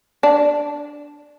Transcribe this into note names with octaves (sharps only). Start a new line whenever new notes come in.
D4